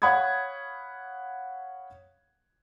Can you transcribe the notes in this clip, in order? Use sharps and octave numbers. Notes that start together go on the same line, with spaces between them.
C#5 F5 F#5 B5 D#6 G#6